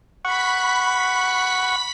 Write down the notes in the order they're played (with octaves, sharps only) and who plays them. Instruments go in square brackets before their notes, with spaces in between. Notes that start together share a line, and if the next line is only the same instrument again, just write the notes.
[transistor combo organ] F#5 C#6 [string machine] B5 B6